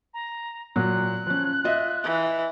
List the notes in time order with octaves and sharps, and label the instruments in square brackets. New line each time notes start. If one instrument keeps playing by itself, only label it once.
[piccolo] A#5
[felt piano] A#2 F#3 [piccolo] F#6
[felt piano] F3 C#4
F4 D#5 E5
[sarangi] E3